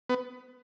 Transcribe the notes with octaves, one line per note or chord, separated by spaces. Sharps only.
B3